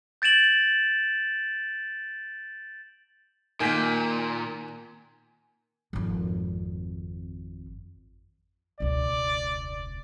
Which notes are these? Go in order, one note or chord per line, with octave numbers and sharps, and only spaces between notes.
G6 A6 D7 E7 F#7
A#2 D#3 A#3 G#5 G6 B6
G#1 F2
E1 C#2 D5